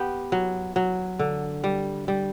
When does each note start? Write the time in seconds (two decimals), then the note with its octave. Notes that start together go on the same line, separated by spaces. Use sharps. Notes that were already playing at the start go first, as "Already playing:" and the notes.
Already playing: B3 G4
0.32 F#3
0.76 F#3
1.19 D3
1.64 G3
2.08 G3